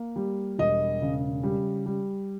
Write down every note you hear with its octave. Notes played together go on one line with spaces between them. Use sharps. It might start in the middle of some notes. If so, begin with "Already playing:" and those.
Already playing: A#3
G3
E1 D#5
C#3
G3
G3